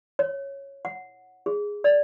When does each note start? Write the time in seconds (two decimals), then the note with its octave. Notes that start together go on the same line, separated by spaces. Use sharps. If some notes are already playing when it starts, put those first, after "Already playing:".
0.19 C#5
0.85 F#5
1.46 G#4
1.84 D5